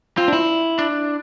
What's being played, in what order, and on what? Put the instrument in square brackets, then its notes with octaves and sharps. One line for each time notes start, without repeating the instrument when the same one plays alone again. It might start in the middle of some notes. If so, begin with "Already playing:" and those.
[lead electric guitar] C4 [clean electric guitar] F4
[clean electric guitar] D4
E4
[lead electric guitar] D4